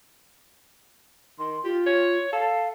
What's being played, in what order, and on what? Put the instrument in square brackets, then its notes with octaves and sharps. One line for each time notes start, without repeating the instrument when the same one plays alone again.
[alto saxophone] D#3 [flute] C6
[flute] F4 [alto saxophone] G4
[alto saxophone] C#5
[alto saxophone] A4 [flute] F5